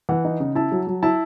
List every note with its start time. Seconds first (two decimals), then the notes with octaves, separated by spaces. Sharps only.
0.09 E3 F#5
0.24 D#4
0.40 C#3
0.55 E4 A5
0.72 F#3
0.87 F#3
1.03 E4 A5